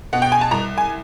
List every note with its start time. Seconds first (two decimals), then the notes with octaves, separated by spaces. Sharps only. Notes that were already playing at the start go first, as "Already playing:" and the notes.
0.13 B2 F#5
0.22 G5
0.32 G#5
0.41 A5
0.51 C2 A#5
0.78 G#5